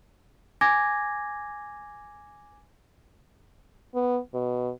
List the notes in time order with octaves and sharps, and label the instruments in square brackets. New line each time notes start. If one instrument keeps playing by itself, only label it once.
[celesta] G#5 D6 G#6 A#6
[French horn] B3
B2